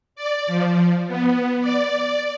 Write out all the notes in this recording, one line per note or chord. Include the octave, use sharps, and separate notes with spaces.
D5
F3
B3
D5